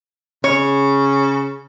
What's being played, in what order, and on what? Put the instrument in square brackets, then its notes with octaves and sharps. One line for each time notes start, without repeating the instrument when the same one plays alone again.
[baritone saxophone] C#3 [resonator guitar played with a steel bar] C#5